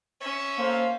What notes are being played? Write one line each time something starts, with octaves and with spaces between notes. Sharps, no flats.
C#4 E5
A#3 A4 C5 F5